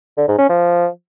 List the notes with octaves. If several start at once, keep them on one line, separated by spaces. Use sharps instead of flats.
D3
G#2
C#4
F3